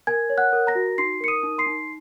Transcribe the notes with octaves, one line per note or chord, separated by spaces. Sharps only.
A#4 G#5 G#6
C#5
F#5 F#6
A#4
A#5 A#6
F#4
D#4 C6 C7
A#4 C#7
D#6 D#7
D#4
C6 C7
D#4